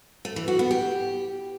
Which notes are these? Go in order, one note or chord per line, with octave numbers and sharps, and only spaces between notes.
A3
E3
F#4
B3
G4